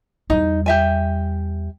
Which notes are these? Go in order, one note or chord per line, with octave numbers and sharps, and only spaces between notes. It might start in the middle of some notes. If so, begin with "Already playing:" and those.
E2 G3 D#4
G4 E5 G#5